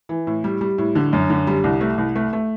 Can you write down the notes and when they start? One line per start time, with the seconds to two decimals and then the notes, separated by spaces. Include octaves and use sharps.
0.09 E3
0.27 A2
0.44 G3
0.61 G3
0.78 A2
0.95 D3
1.13 F#2
1.30 D3
1.47 G3
1.64 C2
1.81 A3
1.98 C2
2.16 A3
2.33 A3